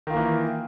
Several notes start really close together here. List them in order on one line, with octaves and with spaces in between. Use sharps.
D#3 F4 A#3 E3